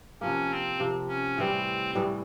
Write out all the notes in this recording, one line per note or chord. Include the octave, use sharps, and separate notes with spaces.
C3 F3 A#3 C#4
C4
C3 F3 A#3
C#4
A2 E3 G3 C4
A2 E3 G3